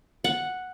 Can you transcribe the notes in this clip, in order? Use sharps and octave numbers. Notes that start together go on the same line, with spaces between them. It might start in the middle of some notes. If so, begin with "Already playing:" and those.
F#5